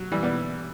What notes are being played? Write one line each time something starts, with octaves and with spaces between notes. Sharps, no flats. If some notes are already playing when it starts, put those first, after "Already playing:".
Already playing: F#3
E3 G3
G3 B3